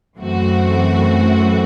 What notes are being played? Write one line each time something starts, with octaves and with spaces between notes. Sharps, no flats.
F#2 E3 A3 C4 F#4